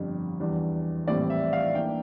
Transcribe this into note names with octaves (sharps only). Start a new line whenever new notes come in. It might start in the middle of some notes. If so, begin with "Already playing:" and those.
Already playing: G1 F2 D3 G3 C4
E2 E3 G3 D4
A#1 A2 E3 G3 C4 D5
E5
F5
E3 A#3 D4 G5